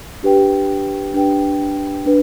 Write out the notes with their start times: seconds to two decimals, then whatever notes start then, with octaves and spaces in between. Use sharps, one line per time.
0.23 D4 G4 B4 G5
1.14 D4 G4 B4 G5
2.06 D4 B4